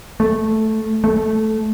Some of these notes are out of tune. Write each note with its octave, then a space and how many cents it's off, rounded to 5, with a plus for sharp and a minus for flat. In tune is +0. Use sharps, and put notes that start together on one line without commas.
A3 -5
A3 -10